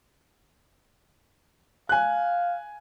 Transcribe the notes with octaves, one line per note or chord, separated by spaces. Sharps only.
F5 G#5 F#6